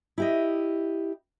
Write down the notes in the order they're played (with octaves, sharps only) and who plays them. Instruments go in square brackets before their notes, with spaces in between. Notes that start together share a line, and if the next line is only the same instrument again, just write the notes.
[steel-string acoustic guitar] E4 G4 D#5